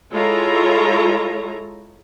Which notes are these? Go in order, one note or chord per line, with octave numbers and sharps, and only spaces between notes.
G#3 E4 F4 A4 C#5 A#5